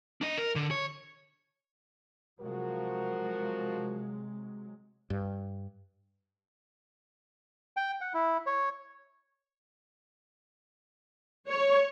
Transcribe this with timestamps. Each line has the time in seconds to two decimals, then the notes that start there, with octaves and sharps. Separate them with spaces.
0.21 D4 D#5
0.38 A#4
0.55 D3
0.71 C#5
2.40 C3 F3 F#3 G#3 F#4 A#4
5.10 G2
7.77 G5
8.01 F#5
8.14 E4
8.46 C#5
11.49 C#5